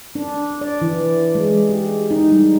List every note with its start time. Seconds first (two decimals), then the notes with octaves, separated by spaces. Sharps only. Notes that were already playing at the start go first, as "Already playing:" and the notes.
0.15 D4
0.61 D5
0.82 E3
1.35 G#3
1.69 G4
2.11 D#4
2.32 G3